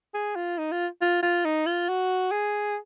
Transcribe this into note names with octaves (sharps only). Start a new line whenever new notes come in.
G#4
F4
D#4
F4
F4
F4
D#4
F4
F#4
G#4